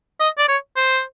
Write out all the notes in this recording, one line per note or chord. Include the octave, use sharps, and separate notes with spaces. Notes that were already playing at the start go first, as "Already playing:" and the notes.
D#5
D5
C#5
C5